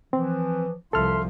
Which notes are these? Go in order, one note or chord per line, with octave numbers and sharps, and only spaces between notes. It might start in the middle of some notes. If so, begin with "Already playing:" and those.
E3 F3 C4
C2 F3 A4 E5 C6 F6